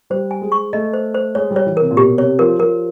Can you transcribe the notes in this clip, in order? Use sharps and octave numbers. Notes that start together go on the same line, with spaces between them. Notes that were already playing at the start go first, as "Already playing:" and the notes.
G3 C5
G#5
G#3
C#6
A3 D#5
C5
C5
G#3 C#5
G3
C#5
E3
C3 A#4
A#2
B2 G4
C3 C#5
F3 A#4
F3 A#4